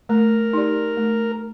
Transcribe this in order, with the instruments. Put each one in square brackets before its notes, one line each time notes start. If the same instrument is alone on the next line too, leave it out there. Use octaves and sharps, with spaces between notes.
[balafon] A3 [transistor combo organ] A#4
[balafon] D#4 G4 D5
A3